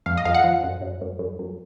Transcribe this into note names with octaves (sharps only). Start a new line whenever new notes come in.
F2 F5
D#5
F2 F5
F#5
F3
F#2
F#2
F#2
F#2
F#2